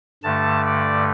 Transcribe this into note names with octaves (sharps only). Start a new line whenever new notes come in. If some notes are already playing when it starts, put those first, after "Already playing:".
G2 D3 A3 A5
D5